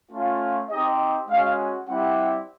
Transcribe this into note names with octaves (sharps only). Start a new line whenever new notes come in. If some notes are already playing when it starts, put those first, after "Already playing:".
A3 C#4 F4
C4 D#4 G4 D#5
G#3 C#4 F#4 F5
G3 C4 E4 G4 F#5